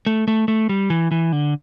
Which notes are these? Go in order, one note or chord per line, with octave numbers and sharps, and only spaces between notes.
A3
A3
A3
G3
E3
E3
D3